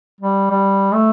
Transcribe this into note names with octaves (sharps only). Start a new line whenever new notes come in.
G3
G3
A3